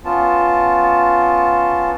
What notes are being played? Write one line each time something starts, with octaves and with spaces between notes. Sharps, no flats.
B3 C#4 F4 A5